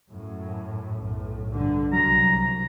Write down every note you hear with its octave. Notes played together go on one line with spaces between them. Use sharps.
F#2 A2
B1 A2
B1 G2 D3
C2 F#3 A#5